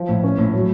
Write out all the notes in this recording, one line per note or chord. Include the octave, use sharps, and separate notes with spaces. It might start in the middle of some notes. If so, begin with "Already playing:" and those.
Already playing: F3
A2
C#4
A2
F#3